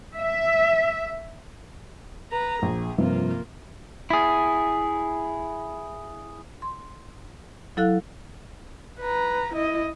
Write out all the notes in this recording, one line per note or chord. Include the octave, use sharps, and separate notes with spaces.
E5
B4 A#5
A#1 G#4
G2 C3 F3 A#3 F4
E4 G#4
C6
F#3 E4 A4 F5 F#6
B4 A#5
E4 D#5